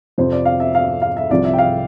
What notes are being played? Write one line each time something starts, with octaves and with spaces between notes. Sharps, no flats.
F2 C3 F3 C5
D5
F5
E5
F5
F5
E5
C2 C3 F3 D5
E5
G5
F5